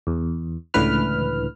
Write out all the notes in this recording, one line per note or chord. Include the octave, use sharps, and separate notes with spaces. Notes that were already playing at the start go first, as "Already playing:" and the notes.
E2
C#2 A2 D3 E3 B4 F6